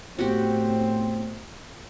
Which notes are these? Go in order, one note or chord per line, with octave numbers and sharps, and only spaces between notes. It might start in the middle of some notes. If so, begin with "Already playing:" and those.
A2 B3 C4 F#4 G4